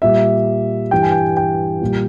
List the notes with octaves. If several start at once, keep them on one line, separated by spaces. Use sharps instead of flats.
A#2 G3 E5
G2 E3 G3 G5
G#5
G5
G5
A#2 G3